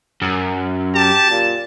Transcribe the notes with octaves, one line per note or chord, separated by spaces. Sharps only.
F#2
G4 A5
A#2